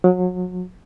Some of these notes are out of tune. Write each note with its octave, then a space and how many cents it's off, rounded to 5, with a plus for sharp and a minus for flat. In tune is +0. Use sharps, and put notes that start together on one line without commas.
F#3 -30